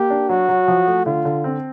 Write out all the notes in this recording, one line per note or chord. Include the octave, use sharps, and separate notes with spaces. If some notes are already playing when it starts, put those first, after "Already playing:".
Already playing: A#3 G4
D4
F#3 F#4
F#3
F3
A3
D3 F4
D3
C4